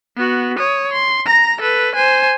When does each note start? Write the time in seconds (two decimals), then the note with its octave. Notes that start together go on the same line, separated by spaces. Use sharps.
0.16 B3 F#4
0.58 C#5 D#6
0.93 C6
1.26 A#5 A#6
1.61 A4 B4
1.95 C5 G#5